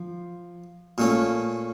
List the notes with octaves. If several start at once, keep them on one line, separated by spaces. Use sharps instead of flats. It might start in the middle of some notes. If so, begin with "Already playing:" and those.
Already playing: F3
A#2 A3 C#4